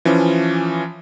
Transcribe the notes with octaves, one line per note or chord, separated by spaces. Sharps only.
E3 F3 C#4